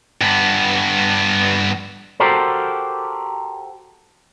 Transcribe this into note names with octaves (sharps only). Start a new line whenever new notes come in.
G2 B3
F#4 G4 A4 A#4 C5